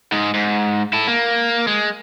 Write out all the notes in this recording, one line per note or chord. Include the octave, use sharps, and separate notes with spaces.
G#2 G#3
G#2
E4 A4
A#3
G#3